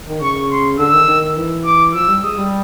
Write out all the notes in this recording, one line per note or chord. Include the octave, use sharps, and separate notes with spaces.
D#3
C#3 C#6
C6
D3 E6
D#3
D#3
E3
D6
F3 E6
G3
G#3 D#6
G3